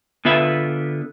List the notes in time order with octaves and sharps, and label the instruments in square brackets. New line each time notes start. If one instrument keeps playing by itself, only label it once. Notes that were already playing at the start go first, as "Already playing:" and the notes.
[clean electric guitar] D3 B3 F4 B4 E5